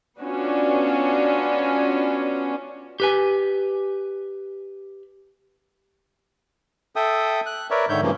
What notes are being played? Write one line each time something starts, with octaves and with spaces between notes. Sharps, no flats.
B3 C#4 D4 F4 F#4
G4 B4 G#5
A4 E5 G5 D#6
F#6
A#4 B4 C#5 D5 E5
G#2 D3 D#3 C#5 E5 G6
G2 C#3 E3 F3 A#3